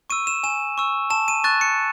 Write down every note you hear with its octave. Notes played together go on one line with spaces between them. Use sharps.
C#6 E6 D#7
E7
G#5 E7
C#6 E6
A5 E7
D#7
C#6 F#6 A6
C#7